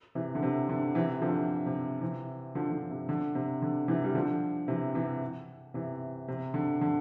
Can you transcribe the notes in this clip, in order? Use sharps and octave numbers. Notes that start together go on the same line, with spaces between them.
C3 E3
D3
C3
D3
C3 E3
D3 F3
C3
C3 E3
D3 F3
D3
C3
D3
C3
D3
C3 E3
G3
D3 F3
C3 E3
C3 E3
C3 E3
C3
D3
D3